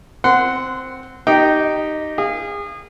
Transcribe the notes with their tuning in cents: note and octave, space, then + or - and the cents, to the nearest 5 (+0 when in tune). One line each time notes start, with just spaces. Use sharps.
C4 +0 F#5 +0 C6 -25
D#4 -10 G4 -15 G5 -10
G#4 -30 F5 -20